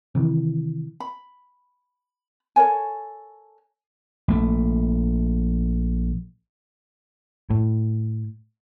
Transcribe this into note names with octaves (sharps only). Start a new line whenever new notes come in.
C3 D#3 E3
B5
A4 A#4 C#5 G#5
A#1 A3
A2